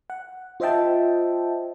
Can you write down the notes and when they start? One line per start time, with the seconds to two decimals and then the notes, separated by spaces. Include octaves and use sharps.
0.10 F#5
0.60 F4 C5 D#5 E5 G5 A5